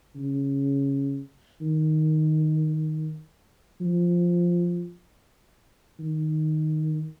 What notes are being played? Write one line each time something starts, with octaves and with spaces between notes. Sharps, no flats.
C#3
D#3
F3
D#3